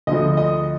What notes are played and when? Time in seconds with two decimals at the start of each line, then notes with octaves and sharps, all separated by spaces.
0.07 D2 D3 F3 D#5
0.37 D#5